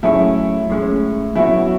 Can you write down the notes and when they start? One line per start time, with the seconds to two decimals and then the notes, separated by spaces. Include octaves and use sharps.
0.03 A2 F#3 C#4 E4 G#4 C#5
0.70 A2 G#3 C#4
1.35 C#3 F#3 B3 E4 F#4 C#5